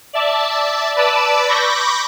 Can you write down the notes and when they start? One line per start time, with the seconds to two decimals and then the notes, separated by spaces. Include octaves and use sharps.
0.13 D5 E5 A5
0.96 B4 D5 A5 D6 E6
1.48 B5 C#6 D6 G6 A#6